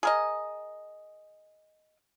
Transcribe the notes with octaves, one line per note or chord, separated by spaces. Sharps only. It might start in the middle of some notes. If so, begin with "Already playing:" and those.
G#4 A#4 D#5